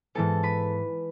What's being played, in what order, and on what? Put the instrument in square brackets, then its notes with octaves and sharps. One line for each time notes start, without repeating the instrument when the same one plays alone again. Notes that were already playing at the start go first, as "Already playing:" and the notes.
[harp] G#2 E3 B3 A4 A5
B4 B5